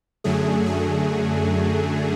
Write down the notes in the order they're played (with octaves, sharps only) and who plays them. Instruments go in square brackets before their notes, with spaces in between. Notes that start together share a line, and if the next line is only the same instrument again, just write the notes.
[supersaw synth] F#2 D3 F#3 A3 G#4
G#4